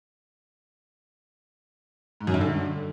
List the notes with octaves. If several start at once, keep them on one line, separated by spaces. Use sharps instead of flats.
G#2
F#2
G2
D3